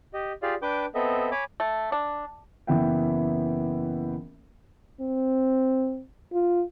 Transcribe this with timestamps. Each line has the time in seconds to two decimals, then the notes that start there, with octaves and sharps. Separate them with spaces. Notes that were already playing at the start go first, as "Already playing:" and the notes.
0.14 G4 D#5
0.42 F4 G4 G#4 D5 F5
0.62 D4 B4 G5 D6 G6
0.95 B3 C4 A4 D#5 E5
1.31 C#5 G#5 B5 D6
1.60 A3
1.92 D4
2.67 F#1 E3 B3 E5 F#5 G5
5.01 C4
6.33 F4